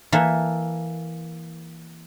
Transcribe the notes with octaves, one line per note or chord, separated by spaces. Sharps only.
E3 A#3 A4 E5